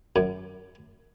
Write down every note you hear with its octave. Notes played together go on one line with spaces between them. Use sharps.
F#2